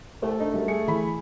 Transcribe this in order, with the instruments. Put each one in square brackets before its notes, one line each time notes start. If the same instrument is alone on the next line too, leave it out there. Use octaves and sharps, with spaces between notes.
[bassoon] C2 [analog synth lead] A3
[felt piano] D4 [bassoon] D#4
[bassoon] F#2 [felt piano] G3
[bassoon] G#4 [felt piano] C#7
[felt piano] E3 B5